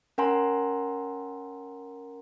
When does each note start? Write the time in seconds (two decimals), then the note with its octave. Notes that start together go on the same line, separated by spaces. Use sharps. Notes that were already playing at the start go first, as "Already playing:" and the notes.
0.18 C#4 A#4 F#5 G#5 A#5 C6